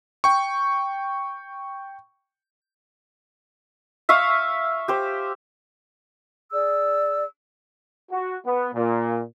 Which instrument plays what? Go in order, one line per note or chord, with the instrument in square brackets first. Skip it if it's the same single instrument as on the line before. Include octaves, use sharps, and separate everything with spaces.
[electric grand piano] G5 C#6
[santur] E5 F5 C#6 D#6
G4 C5
[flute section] G#4 D5 E6
[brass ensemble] F#4
B3
A#2